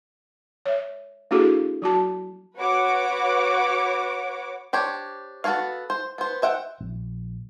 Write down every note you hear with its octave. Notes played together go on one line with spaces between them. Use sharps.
C#5 E5
A#3 D4 E4 F#4 G#4 A4
F#3 F#4 A5
F#4 B4 C#5 F#5 D6
D4 G4 C5 C#5
B3 F#4 A4 C#5 F5
C5
B3 C5
C5 E5 F#5 G5
A#1